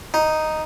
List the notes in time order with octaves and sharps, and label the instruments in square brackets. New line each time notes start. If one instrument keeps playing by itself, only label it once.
[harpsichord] D#4